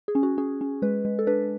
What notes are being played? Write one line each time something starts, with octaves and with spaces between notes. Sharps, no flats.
G#4
C#4
F#4
C#4 G#4
C#4
G#3 B4
G#3
A4
D4 B4